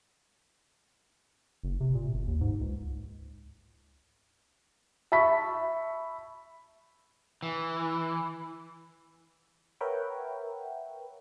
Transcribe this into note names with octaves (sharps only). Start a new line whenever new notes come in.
F#1
C3
A#2
G1
D#2
G#2
C#2
E5 A5 B5 C#6 B6
E3
A#4 B4 C#5 E5 F#5 G5